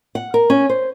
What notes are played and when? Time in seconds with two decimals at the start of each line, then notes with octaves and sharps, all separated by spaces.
0.15 F#5
0.34 A#4
0.50 C#4
0.70 C5